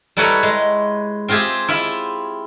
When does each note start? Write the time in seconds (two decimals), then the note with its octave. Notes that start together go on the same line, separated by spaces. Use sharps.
0.17 G3 E4 A4 B4 C#5 A#5
0.43 G#3
1.28 C4 F4 G4 G#4 E5
1.68 E4 F4 E5